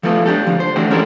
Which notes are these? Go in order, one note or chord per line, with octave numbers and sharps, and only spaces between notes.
F3 A3 B3 F4 A4
D4 D#4 G4 A4
C#2 D3 F3
C5
E3 A3 D4 F#4 G4
G#3 C#4 D4 E4 A4 A#4